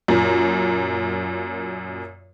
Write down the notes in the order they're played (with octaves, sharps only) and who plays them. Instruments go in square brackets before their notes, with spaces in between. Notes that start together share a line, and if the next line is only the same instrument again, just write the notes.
[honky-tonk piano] F#2 A#2